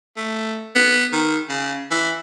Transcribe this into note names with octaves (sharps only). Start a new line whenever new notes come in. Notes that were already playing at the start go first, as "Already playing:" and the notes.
A3
B3
D#3
C#3
E3